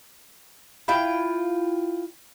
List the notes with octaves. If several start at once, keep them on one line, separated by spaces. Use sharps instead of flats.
E4 F4 G5